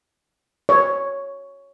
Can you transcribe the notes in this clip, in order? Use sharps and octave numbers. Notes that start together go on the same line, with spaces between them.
C#5